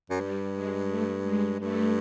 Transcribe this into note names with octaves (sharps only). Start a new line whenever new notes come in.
F#2
G2 G3
G#3
A3
G#3
G2 A3